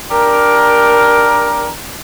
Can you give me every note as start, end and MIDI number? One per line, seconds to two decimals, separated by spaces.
0.10 1.69 62
0.10 1.69 67
0.10 1.69 70